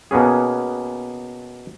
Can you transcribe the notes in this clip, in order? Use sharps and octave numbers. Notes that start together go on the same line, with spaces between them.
B2 A#3 B3 C#4 G#4